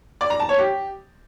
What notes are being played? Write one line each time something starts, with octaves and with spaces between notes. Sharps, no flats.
D5
A#5
A5
C#5
G4